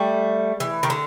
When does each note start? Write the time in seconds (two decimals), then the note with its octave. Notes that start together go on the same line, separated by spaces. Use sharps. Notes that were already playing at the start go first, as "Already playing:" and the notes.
Already playing: G3 A3
0.60 E3
0.83 D#3
0.90 D3